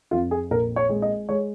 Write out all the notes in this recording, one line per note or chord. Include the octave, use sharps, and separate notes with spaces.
F2 F4
G#4
A#1 A#4
C#5
G#3
D#5
G#3 C#5